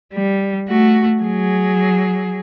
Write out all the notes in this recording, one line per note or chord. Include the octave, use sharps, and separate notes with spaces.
G3
A3 F#4
F#3 G#4